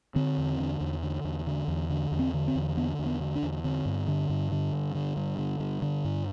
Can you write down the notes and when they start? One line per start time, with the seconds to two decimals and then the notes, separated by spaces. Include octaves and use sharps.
0.16 D3 C4
0.38 E2
0.59 D3
0.81 E2
1.03 D3
1.24 E2
1.47 D3
1.68 E2
1.90 D3
2.12 E2
2.19 C4
2.34 D3
2.48 C4
2.55 E2
2.77 D3 B3
2.99 E2
3.06 B3
3.20 D3
3.35 D4
3.43 E2
3.64 D3 C4
3.86 G2
4.08 D3
4.29 G2
4.52 D3
4.73 G2
4.95 D3
5.17 G2
5.39 D3
5.60 G2
5.82 D3
6.04 G2